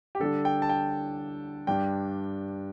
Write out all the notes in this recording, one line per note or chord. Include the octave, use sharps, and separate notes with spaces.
G4
D3 G3 D4 A4
G5
A5
G5
G2 G3 D4 G5